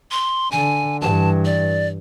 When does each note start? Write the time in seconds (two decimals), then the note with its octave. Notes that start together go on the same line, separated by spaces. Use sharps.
0.11 C6
0.52 D3 G#5
1.01 G2 E3 A5
1.45 D5